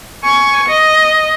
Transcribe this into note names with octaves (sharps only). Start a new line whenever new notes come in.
G#5 C#6
D#5